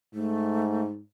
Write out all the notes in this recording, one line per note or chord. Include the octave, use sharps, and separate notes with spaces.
G#2 A3